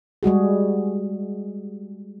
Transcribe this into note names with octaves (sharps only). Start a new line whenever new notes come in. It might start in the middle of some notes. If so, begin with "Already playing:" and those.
G3 G#3 F#4 G#4